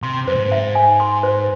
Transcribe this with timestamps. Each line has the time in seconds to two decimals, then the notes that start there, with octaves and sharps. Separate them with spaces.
0.02 C3 C6
0.27 F#2 C5
0.36 G#2
0.52 E5
0.75 G#5
1.00 C6
1.23 C5